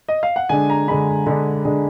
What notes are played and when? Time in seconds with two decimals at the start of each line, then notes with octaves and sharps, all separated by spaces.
0.09 D#5
0.23 F5
0.36 F#5
0.49 D3 G#3 D4 G#5
0.70 A#5
0.88 D3 G#3 D4 B5
1.26 D3 G#3 D4
1.65 D3 G#3 D4